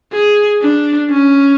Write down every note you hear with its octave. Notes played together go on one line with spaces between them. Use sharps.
G#4
D4
C#4